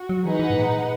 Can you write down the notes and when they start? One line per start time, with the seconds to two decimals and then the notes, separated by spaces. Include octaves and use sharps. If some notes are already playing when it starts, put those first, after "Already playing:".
Already playing: F#4
0.09 F#3
0.25 E3 D#4 G#4 B4 F#5
0.39 E3
0.50 G#2
0.55 A#2